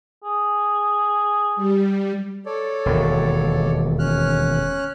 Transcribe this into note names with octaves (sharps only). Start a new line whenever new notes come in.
G#4
G3
A4 C#5 D5
E1 D#2
C#4 F6 F#6